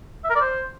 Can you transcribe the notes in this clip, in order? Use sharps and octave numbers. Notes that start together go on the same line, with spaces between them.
E5
A#4
D5
C5